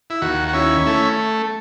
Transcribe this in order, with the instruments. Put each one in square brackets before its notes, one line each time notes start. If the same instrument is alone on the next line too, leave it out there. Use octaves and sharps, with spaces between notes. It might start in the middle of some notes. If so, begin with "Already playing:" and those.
[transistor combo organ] E4
D#2 F#4
F#4
C#4 E4
A3 E4